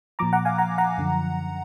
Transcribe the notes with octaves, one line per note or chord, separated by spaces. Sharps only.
A#2 F3 A#5 D6
F#5 A#5
F5 G#5
F#5 A#5
F#5 A#5
F#2 D3 F3